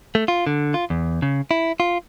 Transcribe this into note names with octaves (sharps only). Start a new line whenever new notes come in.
A3
F4
D3
F4
E2
C#3
E4
F4